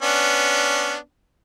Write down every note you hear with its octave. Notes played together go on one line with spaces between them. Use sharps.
B3 C#4 D4